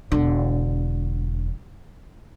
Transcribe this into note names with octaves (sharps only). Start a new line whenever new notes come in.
E1 D3